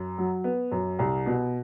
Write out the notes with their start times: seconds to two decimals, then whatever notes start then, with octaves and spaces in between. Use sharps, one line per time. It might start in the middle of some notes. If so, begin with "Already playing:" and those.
Already playing: F#2
0.18 F#3
0.44 B3
0.72 F#2
0.99 C2
1.26 B2